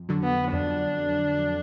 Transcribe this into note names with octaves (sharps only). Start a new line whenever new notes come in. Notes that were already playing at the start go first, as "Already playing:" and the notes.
Already playing: F2
D3 F#3
B3
F2 D4